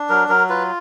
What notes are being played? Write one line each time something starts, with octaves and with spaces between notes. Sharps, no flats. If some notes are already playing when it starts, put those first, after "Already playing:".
Already playing: D4
F#3 A#4
F#3 A#4
F4 B4